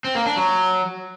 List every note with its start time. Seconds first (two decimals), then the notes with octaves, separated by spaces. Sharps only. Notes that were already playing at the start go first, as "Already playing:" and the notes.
0.04 C4
0.15 A#3
0.26 D4
0.37 F#3